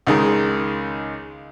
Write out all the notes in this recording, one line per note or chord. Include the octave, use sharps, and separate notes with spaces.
C#2 D#3 G#3